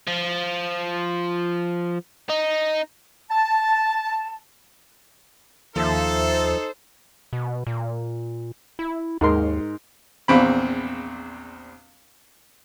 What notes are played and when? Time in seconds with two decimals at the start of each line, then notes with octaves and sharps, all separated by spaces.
0.08 F3
2.29 D#4
3.30 A5
5.76 D#2 F3 D#4 A4 C5 E5
7.33 B2
7.67 A#2
8.79 E4
9.21 D#2 G#2 A#4 C6
10.28 A#1 E2 C4 B5